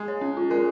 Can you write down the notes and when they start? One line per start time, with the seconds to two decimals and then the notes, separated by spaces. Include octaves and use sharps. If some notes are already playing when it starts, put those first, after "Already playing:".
Already playing: G#3
0.08 C#5
0.21 C#4
0.37 F4
0.50 G#3 A#4